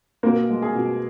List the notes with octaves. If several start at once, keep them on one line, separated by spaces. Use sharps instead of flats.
B2 A#3 A#4
G#3
G#4
B2